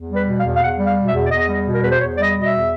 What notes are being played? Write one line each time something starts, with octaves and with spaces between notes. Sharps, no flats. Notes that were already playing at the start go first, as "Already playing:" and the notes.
Already playing: E2
G3
B4
B2
F5
E2
F5
E2 F#5
G3
F5
B2
E5
E2
D5
E2 D#5
G3
B2
A#4
E2 B4
C5
E2 C#5
G3 D5
D#5
B2
D#5
E5
E2